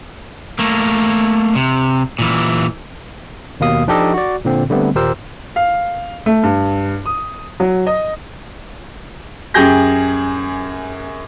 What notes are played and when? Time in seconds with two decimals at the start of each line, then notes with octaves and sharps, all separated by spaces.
0.59 A3 A#3
1.56 C3
2.19 A#2 E3
3.60 D#2 B2 A#3 F5 D#6
3.87 F3 D4 D#4 G4 A4 D#5
4.14 F#4 D5
4.45 A#2 D3 C4
4.70 D3 G3 A3 B3 C4
4.95 D#2 A#2 G4 A#4 C5 E6
5.56 F5
6.26 A3
6.43 G2
7.06 D#6
7.60 F#3
7.87 D#5
9.54 F#2 G4 G#4 G6 A#6